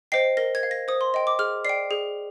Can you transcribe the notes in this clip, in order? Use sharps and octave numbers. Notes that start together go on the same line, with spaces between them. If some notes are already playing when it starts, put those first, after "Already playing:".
C5 D#5 G5 C7
A#4 A#6
G#6
F5
A#6
C5 D#6
C6
D#5 G5
D6
G#4 F6
D5 G5 C7
G#4